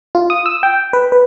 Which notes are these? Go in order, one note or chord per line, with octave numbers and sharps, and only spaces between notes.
F4
D#6
E6
G5
B4
B4